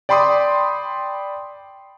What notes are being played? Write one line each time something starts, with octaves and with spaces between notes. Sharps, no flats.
D5 G5 B5 C6 D6 D#6